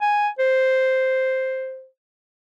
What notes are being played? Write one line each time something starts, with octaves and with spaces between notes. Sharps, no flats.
G#5
C5